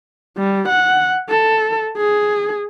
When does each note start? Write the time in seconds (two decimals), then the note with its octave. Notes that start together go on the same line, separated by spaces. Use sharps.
0.38 G3
0.69 F#5
1.30 A4
1.97 G#4